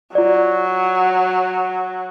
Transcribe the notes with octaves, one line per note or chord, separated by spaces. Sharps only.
F#3 F4 D5